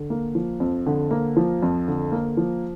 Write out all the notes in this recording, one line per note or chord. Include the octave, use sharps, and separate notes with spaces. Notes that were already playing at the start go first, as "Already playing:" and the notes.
Already playing: D3
A#3
F3
F2
D3
A#3
F3
F2
D3
A#3
F3